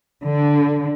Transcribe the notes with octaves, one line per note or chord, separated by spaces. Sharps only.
D3